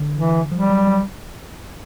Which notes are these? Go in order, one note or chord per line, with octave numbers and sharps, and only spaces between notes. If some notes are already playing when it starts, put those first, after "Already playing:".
Already playing: D3
E3
F3 G3
F#3
F#3